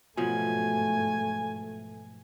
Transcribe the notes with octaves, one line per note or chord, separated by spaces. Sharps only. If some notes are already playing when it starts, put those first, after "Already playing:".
G#2 B2 F3 F#3 A3 G#5